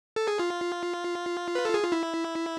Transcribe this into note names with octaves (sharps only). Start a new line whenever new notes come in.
A4
G#4
F4
B4
A4
G#4
F4
E4